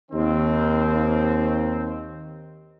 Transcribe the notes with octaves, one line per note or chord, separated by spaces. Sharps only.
D#2 D#3 C4